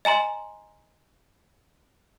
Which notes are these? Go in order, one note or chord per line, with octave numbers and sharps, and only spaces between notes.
D#5 G#5 A#5 C6